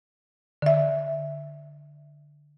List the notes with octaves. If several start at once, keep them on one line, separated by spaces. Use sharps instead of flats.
D3 E5